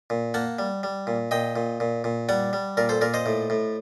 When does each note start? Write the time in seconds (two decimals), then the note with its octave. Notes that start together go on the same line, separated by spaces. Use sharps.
0.10 A#2
0.34 A#3 F#5 A5
0.59 G3
0.83 G3
1.07 A#2
1.31 A#2 D#5 G5
1.56 A#2
1.80 A#2
2.04 A#2
2.29 G3 D5 F#5
2.53 G3
2.77 A#2 A#4 D5
2.89 A4 C5
3.01 A#2 A#4 D5
3.14 C5 D#5
3.26 A2
3.50 A2